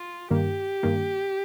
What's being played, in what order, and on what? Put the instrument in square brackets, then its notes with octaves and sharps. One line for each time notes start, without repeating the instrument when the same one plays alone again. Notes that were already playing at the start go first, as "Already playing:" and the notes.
Already playing: [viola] F4
[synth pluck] G2 D#3 A#3 [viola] G4
[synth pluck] G2 D#3 A#3